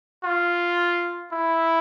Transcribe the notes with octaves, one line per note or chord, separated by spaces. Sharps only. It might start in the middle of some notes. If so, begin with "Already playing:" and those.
F4
E4